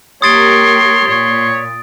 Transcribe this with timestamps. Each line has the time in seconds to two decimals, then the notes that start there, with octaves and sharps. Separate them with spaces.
0.22 A#3 G4 A#4 C#5 C6 D#6 A6 D7
1.07 A#2 C#5